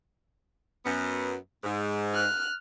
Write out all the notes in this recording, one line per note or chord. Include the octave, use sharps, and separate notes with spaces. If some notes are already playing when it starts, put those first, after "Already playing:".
F#2 B3
G#2
F6 F#6